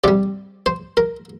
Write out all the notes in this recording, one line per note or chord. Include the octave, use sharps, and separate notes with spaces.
C3 G3 D5
C5
A#4